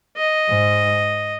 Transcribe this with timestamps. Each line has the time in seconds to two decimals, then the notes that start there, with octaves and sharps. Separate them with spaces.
0.17 D#5
0.49 G#2